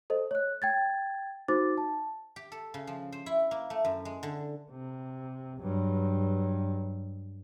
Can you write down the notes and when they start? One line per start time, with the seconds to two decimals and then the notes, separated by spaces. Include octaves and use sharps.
0.10 A4 C5 D#5
0.31 C#5 F#6
0.62 G5 G#6 A6
1.48 D#4 F#4 C5 D6 A6
1.78 A5
2.36 G4
2.52 A4
2.74 C#3
2.87 F3
3.12 C5
3.26 E4
3.51 A#3
3.70 A3
3.85 F#2
4.05 G#3
4.23 D3
4.71 C3
5.61 G2 F#3